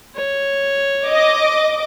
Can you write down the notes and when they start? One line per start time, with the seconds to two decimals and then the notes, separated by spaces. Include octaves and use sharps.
0.16 C#5
1.05 D#5 D6